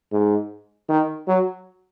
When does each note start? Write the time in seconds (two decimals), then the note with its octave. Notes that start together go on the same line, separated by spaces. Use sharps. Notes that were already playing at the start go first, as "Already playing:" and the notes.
0.12 G#2
0.89 D#3
1.28 F#3